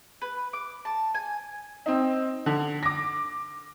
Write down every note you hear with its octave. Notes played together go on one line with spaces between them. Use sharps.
B4
D6
A5
G#5
C4 D#4
D3
D6 A#6